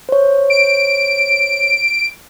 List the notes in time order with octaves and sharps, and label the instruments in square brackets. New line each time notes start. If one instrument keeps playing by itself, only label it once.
[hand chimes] C5 C#5
[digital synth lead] D7